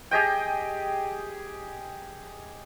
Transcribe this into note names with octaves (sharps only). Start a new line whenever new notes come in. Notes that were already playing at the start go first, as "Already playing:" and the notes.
G4 G#4 D#5 G5